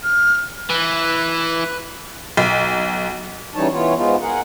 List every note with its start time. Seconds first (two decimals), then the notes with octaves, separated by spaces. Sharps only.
0.03 F6
0.69 E3 B4
2.37 B1
3.55 C#3 E3 G3 D#4 C#5 A5
3.72 E3 B3 F4 C#5
3.97 G#2 G#3 B3 D#4 F4
4.22 G#4 A#4 F#5